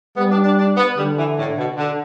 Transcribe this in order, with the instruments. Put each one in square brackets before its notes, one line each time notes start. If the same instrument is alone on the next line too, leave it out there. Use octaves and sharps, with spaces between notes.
[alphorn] G3 [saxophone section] B3
[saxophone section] D4
D4
D4
B3
[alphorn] D3 [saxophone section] G3
[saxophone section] E3
A2
B2
D3